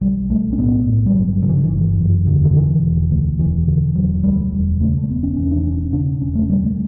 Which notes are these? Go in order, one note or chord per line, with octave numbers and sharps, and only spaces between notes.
B1 G3
B1 A3
C#4
A2 B3
A2
G3
G1 F#3
C#3 F#3
E3
D3
E3
G1
F#2
E1 D3
D3
D3 E3
E1
D2
E1 E3
D3
E1 F#3
D2 G3
E1
C#3 A3
A3
E1 B3
C#4
E2 C#4
D4
E1 C#4
C#3 D4
E1 C#4
A3
D2 G3
A3